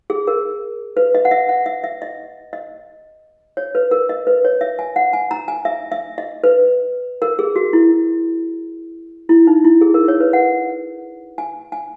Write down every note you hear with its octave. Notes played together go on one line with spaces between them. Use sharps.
G#4
A#4
B4
D#5
F#5
E5
F#5
E5
E5
D#5
D#5
C#5
B4
A#4
D#5
B4
C#5
E5
G#5
F#5
G#5
A#5
G#5
E5
E5
D#5
B4
A#4
G#4
F#4
E4
E4
D#4
E4
G#4
A#4
C#5
B4
F#5
G#5
G#5